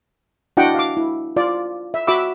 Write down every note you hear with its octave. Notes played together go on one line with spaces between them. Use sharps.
D4 E4 F#4 D#5 F#5 G5
F5 D6
E4
F4 D5
E5
F#4 E5 B5 D6 E6